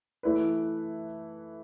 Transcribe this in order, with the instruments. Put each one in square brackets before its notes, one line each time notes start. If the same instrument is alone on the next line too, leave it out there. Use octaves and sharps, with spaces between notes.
[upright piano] E3 A3 E4 B4